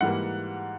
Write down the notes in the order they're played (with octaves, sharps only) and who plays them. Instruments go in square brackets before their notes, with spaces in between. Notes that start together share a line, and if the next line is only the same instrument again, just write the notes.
[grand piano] G#2 E3 G3 A#3 F#5